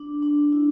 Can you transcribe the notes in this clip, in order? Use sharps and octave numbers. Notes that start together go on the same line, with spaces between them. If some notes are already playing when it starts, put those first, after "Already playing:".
Already playing: D4
D4
E4